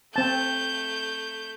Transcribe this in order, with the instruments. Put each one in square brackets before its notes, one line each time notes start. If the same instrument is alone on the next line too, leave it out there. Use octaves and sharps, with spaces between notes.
[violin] A3 G6 [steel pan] C4 A5